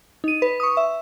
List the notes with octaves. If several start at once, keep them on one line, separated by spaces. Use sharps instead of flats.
D#4 D#7
B4
C#6 D#6
E5